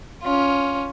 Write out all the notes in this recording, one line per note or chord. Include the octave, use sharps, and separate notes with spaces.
C#4 F4